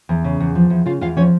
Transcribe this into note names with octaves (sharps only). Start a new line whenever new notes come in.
E2
C#3
E2
F3
E2
C#3 F4 F5
E2 F4 F5
F3 C#4 C#5